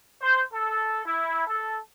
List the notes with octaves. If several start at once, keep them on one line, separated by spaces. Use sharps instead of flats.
C5
A4
E4
A4